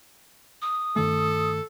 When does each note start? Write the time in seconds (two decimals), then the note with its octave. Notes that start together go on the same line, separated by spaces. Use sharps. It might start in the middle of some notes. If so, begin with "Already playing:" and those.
0.62 D#6
0.96 G2 D#3 A3 A4